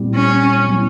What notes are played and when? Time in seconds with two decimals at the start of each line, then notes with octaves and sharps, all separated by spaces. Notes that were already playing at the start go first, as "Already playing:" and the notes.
Already playing: A#2 G3 C4 E4 G4
0.15 C#4
0.68 F#3 B3 E4